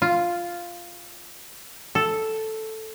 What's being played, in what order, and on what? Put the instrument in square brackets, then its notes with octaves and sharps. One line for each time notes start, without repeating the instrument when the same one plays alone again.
[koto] F4
A4